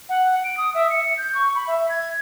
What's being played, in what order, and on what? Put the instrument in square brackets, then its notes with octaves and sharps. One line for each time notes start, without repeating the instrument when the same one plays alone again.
[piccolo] F#5
D7
D#6
E5
C#7
G6
C#6
B5
E5
G#6